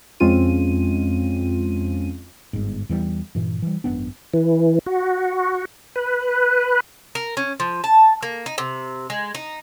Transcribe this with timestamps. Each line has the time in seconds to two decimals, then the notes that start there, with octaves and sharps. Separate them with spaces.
0.20 F2 G#3 C4 C#4 F4 D#7
2.53 G1 G#2
2.89 E2 E3 F#3 G3
3.35 G2 A#2 E3
3.62 E3 G3
3.84 G#1 F#2 B3 D4
4.34 E3
4.86 F#4
5.96 B4
7.15 A#4
7.37 C#4
7.60 F3
7.84 A5
8.23 A#3
8.46 D#4
8.58 C3
9.10 G#3
9.35 D#4